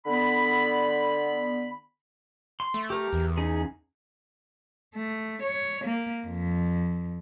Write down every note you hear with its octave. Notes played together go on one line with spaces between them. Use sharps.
D3 B3 B5
C6
A3
G4 A#4
E2
C#4 D#4 G#4
A3
C#5
A#3
F2